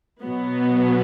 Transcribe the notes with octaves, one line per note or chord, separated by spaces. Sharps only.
B2 F#3 B3